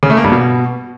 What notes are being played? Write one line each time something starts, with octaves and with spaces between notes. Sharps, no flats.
C#3
A3
A#3
G2
B2